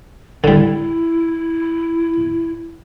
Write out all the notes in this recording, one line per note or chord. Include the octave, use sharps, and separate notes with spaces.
D3 G3 E4